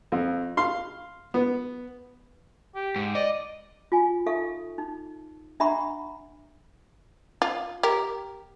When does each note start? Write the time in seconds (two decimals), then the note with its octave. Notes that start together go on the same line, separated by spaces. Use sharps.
0.12 F2
0.57 F5 C6
1.34 B3
2.75 G4
2.96 G#2
3.15 D5 D#5
3.92 F4 G#5
4.26 D#4 A4 E5 F5 C#6
4.78 D#4
5.60 D4 E5 F#5 A#5 B5 C#6
7.42 F4
7.83 G4 A#4